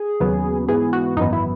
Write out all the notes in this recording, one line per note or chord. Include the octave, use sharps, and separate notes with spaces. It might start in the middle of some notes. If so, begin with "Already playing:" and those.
Already playing: G#4
D#2 C#3 F#3 B3
G#2 E3 B3 G#4
F#4
G#1 F#2 E3 B3 D#4
E4